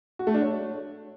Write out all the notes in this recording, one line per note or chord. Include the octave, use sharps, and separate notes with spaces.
F#4
A3
D4
C#5